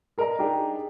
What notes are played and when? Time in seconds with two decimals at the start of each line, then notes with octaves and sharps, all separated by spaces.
0.18 G#4 A#4 D5 D#5 A#5
0.39 D4 D#4 G4 G#4